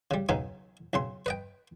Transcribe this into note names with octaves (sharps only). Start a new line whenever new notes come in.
C#3 G3
B1 C#3 B3 D#4 G#5
B1 C#3 C6
B4 D#5 G5